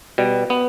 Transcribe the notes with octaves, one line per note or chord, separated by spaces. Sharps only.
B2 G3
B3